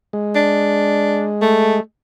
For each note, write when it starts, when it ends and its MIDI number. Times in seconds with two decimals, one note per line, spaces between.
0.13 1.80 56
0.36 1.29 62
1.42 1.78 57